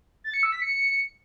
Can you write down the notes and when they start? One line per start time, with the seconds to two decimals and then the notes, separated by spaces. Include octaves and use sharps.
0.24 A6
0.34 C#7
0.43 E6
0.52 B6
0.62 C#7